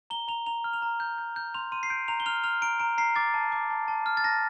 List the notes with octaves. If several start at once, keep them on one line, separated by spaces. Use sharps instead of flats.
A#5 G7
A#5 F7
A#5 F7
F6
F7
A#5
G6
G6
G6
C6 F7
C6 D#7
C7
G6 D7
A#5 F7
G7
F6 F7
F6 F7
A#5 D7
A#5 D7
A#5 C7
D6 A6
A5
D6
A5
A5
F6
A6
A5 A#6